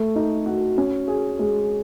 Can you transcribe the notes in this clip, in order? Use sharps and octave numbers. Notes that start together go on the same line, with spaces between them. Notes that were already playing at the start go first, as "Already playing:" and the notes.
Already playing: A3
D#4
F#4
C#4
G#4
G#3